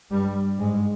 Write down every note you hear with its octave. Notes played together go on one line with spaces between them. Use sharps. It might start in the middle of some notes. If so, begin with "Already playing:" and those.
G2 G3
G#2 G#3